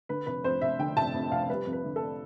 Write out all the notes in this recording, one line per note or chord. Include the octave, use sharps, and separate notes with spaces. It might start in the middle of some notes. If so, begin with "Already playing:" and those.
D3 B4
F1 B4
F2 C5
F1 E5
D3 G5
F1 A5
F2
F1 F5
G3 B4
F2
B4
D3
A4
D4